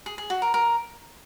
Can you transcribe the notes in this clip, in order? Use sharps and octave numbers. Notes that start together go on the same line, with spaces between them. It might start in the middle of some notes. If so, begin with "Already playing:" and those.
G#4
G#4
F#4
A#4
A#4